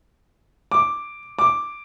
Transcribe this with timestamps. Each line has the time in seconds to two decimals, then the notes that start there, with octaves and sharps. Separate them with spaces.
0.72 D6
1.39 D6